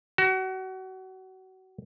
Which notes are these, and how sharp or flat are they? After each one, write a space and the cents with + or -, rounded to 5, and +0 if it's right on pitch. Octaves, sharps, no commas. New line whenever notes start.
F#4 +30